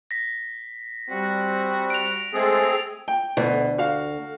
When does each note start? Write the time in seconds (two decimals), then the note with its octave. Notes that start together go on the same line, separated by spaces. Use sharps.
0.11 A#6 B6
1.10 G3 C4 F#4
1.90 D7 F7
2.34 G#3 A3 C4 G#4 A4
3.08 G5
3.37 D2 B2
3.78 F#4 F5